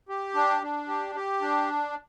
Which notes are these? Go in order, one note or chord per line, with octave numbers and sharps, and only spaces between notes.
G4
D4
D4
G4
G4
D4